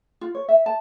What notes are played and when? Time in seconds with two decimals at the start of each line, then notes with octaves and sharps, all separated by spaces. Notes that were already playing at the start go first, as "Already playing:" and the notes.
0.21 F4
0.35 C#5
0.49 E5
0.66 A5